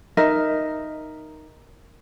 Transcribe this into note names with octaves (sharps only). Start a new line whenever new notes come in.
D#4 A#4 E5